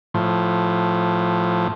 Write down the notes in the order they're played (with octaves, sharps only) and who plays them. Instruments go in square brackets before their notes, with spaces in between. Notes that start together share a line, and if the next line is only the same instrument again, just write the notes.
[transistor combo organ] A2 F3